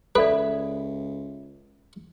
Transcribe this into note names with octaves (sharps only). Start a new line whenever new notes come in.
C#2 A4 B4 C#5 D5 E5